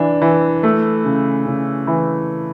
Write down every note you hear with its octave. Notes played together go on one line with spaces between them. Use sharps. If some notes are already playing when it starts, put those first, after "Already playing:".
Already playing: E3 D4
E3
A3
C#3
C#3
E3